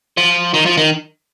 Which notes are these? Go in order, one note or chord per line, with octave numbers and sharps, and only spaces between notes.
F3
D#3
F3
D#3